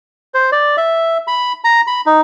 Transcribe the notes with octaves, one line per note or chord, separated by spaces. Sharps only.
C5
D5
E5
B5
A#5
B5
D#4